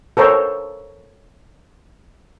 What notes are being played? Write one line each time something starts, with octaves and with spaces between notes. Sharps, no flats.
A4 A#4 C5 C#5